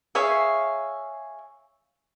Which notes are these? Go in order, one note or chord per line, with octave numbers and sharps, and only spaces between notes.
G#4 C#5 E5 F5